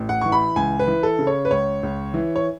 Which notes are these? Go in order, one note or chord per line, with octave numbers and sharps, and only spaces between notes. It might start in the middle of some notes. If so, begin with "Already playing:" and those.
Already playing: A1
F#5
E3 C#6
B5
C#2 G#5
B4
E3
A4
C#3
C#5
B4
C#2 C#5
C#2
E3
C#5